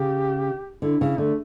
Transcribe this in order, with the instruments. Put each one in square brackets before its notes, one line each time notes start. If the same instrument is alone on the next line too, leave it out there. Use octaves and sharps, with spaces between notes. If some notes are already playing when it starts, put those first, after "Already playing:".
Already playing: [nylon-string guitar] C#3 [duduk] G4
[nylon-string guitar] D3 [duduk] E4
[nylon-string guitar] C#3 [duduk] E4
[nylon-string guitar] D3 [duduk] A3